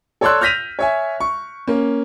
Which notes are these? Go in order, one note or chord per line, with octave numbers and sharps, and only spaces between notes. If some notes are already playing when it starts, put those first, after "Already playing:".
A4 C#5 D5 C6 E6 F#6
F6 G6 A#6 B6 D#7 F7
C#5 E5 G#5
C#6
A#3 C#4